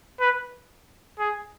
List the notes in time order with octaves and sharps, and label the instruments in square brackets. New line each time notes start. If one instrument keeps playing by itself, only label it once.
[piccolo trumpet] B4
G#4